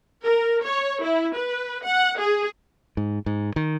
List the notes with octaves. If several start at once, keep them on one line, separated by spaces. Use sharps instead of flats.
A#4
C#5
E4
B4
F#5
G#4
G#2
G#2
D#3